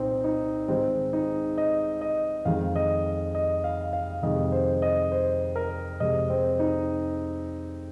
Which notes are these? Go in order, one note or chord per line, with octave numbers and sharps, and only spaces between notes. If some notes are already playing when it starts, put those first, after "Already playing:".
Already playing: C2 A#2 C4 D#4
D#4
G#2 D#3 G#3 C4
D#4
D#5
D#5
F2 D#3 G#3 F5
D#5
D#5
F5
F5
F2 C3 D#3 G#3 D#5
C5
D#5
C5
A#4
F2 C3 G#3 D#5
C4
D#4